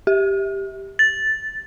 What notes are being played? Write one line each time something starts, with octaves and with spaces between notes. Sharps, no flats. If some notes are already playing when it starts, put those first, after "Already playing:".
G4
A6